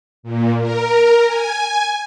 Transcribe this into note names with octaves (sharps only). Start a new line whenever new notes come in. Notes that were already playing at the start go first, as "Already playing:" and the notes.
A#2
A#4
G#5